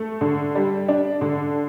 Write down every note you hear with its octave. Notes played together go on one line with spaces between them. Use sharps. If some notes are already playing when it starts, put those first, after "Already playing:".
Already playing: A3
D3
G3
D4
D3